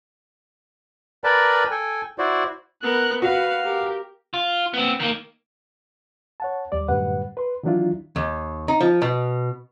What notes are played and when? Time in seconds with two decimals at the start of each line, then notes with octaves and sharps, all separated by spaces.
1.24 A#4 B4 D5 G5 A5 B5
1.71 A4 G5 G#5
2.18 E4 F#4 C5 D5
2.83 B3 A#4 F#6
3.22 F#4 B4 F5
3.64 G4 A#4
4.34 F4
4.74 B3 C4
5.00 D#3 A#3
6.40 C#5 F#5 A5
6.72 D#2 G3 D5
6.88 F#2 A2 D3 G3 B4 F#5
7.37 B4 C6
7.63 D#3 E3 F#3 D4 E4 F4
8.16 D#2
8.68 D#4
8.81 F3
9.02 B2